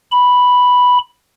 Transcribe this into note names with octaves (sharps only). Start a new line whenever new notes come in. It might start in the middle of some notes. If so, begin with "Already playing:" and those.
B5